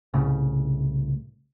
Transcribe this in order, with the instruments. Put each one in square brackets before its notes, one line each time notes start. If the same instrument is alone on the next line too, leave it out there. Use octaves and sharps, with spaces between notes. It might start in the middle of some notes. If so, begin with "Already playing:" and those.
[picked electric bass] C2 A2 C#3